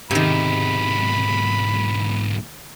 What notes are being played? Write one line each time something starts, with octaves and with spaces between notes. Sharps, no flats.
B1 G#2 C3 D#3 B5